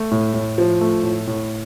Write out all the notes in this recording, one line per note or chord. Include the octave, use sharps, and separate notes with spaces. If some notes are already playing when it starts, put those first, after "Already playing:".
Already playing: A3
A2
A2
F3
A3
A2
A2